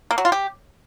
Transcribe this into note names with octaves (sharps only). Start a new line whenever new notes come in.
A#3
F#3
F4
G4